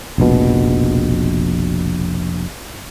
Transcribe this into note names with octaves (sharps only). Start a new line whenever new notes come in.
F1 A#1 B2